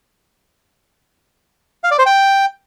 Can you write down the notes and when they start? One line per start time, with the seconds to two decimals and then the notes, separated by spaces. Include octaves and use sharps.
1.84 F5
1.91 D5
1.99 C5
2.06 G5